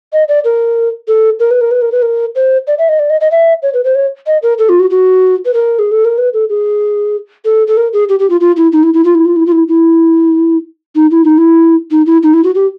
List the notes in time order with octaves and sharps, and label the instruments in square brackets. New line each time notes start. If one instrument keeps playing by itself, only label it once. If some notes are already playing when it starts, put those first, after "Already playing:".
[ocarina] D#5
D5
A#4
A4
A#4
B4
A#4
B4
A#4
B4
A#4
C5
D5
E5
D#5
D5
D#5
D#5
E5
C#5
B4
C5
C#5
D#5
A#4
A4
F4
F#4
F#4
B4
A#4
G#4
A4
A#4
B4
A4
G#4
A4
A4
A#4
G#4
G4
G4
F4
F4
E4
D#4
E4
E4
F4
E4
F4
E4
F4
E4
E4
D#4
E4
D#4
E4
D#4
E4
D#4
E4
F#4
G4